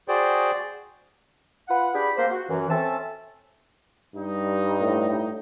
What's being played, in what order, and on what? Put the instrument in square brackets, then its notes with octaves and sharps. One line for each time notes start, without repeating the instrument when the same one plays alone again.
[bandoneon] F#4 G#4 C5 D5 G5
[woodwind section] F4 B4 F#5
D4 G4 G#4 B5
A#3 C4 C5
F#4
F#2 E3
C4 C#4 A4 E5 A5
[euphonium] G2 [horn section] G3 D#4
[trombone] A2